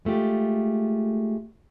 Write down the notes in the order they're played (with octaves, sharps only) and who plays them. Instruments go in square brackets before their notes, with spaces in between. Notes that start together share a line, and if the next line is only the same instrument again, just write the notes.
[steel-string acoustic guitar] G#3 A3 F4 G4